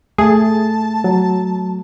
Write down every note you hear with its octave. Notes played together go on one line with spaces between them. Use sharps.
A3 G#4 A5
F#3